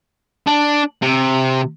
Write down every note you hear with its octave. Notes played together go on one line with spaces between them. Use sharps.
D4
C3